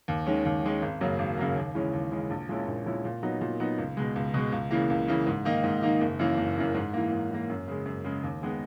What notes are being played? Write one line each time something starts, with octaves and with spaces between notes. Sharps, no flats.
D#2
D#3 G#3 C#4
D#2
D#3 G#3 C#4
G#1
F#2 C#3 F#3 A#3
G#1
F#2 C#3 F#3 A#3
D#2
C#3 E3 G#3 C#4
D#2
C#3 E3 G#3 C#4
A#1
A#2 G#3 C#4 E4
A#1
A#2 G#3 C#4 E4
A#2
F#3 B3 D#4
A#2
F#3 B3 D#4
C#2
B2 G#3
C#2
B2 G#3
C#2
C#3 E3 A#3
C#2
C#3 E3 A#3
G#2
D#3 A#3 D#4
G#2
D#3 A#3 D#4
F#1
F#2 E3 A#3
F#1
F#2 E3 A#3
G#2
E3 A#3
G#2
E3 A#3
F#2
C#3 G#3
F#2
C#3 G#3
D#2
D#3 G#3 B3 D#4